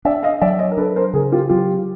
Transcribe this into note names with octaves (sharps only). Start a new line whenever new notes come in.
D4 D5 E5
D#5 F5
F#3 D5 E5
C#5 D#5
A#4
D4 A4 B4
A#4 C5
C#3 G#4 A#4
F4 G4
F#3 F4 G4